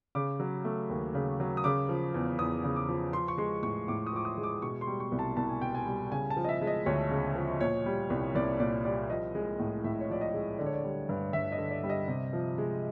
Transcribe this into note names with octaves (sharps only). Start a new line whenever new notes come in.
C#3 D6
F#3
A3
D#2
C#3
F#3
D#6
C#3 D6
F3
E2
E2 D#6
C#3
D6
F3
F3 C6
C#6
G#3 C6
A2 C#6
A2 D6
D#6
F3 D6
D#6
G#3
D6
B2 C#6
C6
G3
C#6
C2
A5
C2 A5
G#5
B2 G5
G#5
G3
C#3 G#5
A5
F3
D#5
E5
G#3
D#5
D2 C#5
C#3
F3
A#2 C#5
G3
C2
C2 D5
A#2 D5
G3 D5
F3 D#5
G#3
A2
A2 E5
C#5
F3 D5
D#5
G#3
D3 D5
C#5
D5
G3
G2
G2 E5
D#5
D3
D5
G3
D#5
C3
F3
G#3